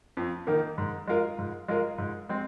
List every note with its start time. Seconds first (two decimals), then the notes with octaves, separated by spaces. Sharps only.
0.17 F2
0.47 D#3 A#3 D#4 A#4
0.78 G#2
1.08 G#3 F4 A#4
1.38 G#2
1.68 G#3 F4 A#4
1.98 G#2
2.29 G#3 C4